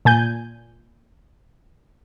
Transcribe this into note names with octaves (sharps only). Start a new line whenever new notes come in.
A#2 G#5 G6